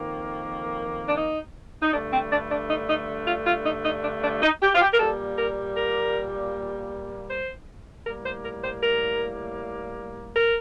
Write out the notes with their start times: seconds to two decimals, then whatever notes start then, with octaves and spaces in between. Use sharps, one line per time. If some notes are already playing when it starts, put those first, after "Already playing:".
Already playing: F2 D#3 A#3
1.09 D4
1.17 D#4
1.82 D#4
1.93 G2 D3 A3 D4
2.13 C4
2.32 D4
2.51 D4
2.70 D#4
2.89 D#4
3.27 F4
3.47 F4
3.66 D#4
3.85 D#4
4.04 D4
4.24 D4
4.42 D#4
4.62 G4
4.75 F4
4.82 G4
4.94 A#4
5.00 A#2 G3 A#3 A4
5.38 A#4
5.77 A#4
7.30 C5
8.06 A2 G3 A#3 A#4
8.26 C5
8.45 A#4
8.64 C5
8.83 A#4
10.36 A#4